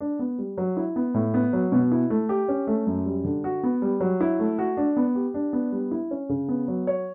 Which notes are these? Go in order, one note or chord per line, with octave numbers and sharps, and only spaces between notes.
D4
B3
G3
F#3
E4
B3
A2
B3
F#3
B2
E4
A3
G4
C#4
A3
F#2
G3
D3
F#4
B3
G3
F#3
E4
A3
F#4
D4
B3
G4
D4
B3
G3
E4
C#4
C#3
B3
F#3
C#5